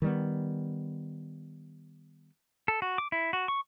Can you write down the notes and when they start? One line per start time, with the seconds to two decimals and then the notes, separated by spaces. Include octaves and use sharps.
0.02 D#3 G3 B3
2.68 A4
2.82 F#4
2.98 D6
3.12 E4
3.33 F#4
3.48 C#6